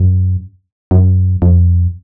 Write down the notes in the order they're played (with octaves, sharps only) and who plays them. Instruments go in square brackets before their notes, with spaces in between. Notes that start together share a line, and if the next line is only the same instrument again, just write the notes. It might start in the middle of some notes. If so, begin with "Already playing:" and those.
Already playing: [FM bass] F#2
F#2
F2